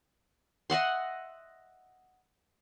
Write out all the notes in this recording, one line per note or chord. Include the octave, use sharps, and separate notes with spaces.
D#5 E5 F#5 C6